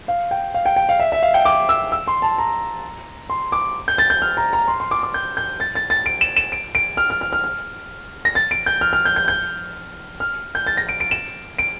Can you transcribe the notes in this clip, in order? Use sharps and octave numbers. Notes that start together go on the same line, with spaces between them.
F5
G5
F5
G5
G5
F5
E5
E5
F5
G5
D6
E6
E6
C6
A5
A#5
C6
D6
G6
A6
G6
F6
A#5
A#5
C6
C6
D6
D6
G6
G6
A6
A6
A6
D7
E7
E7
D7
D7
F6
F6
F6
F6
F6
A#6
A6
D7
G6
F6
F6
G6
G6
G6
F6
G6
A6
A#6
D7
D7
E7
D7